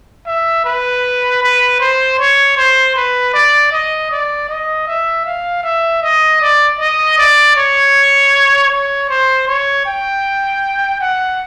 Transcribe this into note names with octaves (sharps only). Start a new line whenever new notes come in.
E5
B4
B4
C5
C#5
C5
B4
D5
D#5
D5
D#5
E5
F5
E5
D#5
D5
D#5
D5
C#5
C#5
C5
C#5
G5
F#5